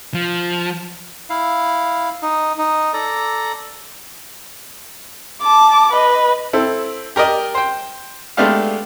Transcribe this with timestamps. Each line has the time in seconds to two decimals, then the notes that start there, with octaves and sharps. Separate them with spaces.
0.14 F3
1.30 E4 F5
2.22 D#4
2.58 D#4
2.93 A4 D5 A#5
5.42 A5 D6
5.92 B4 D#5
6.53 C4 E4 A4
7.16 G4 A#4 D5 D#5
7.55 C5 G5
8.37 G#3 A3 B3 D4 G4 F5